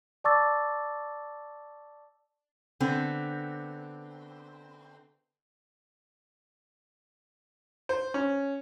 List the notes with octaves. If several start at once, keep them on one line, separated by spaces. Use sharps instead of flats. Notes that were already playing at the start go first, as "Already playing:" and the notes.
D5 A5 C#6 D6 E6 A6
D3 B3 C4
C5
C#4